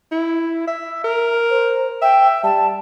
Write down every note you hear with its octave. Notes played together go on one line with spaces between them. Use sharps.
E4
E5
A#4
C5
E5 G5
G3 A5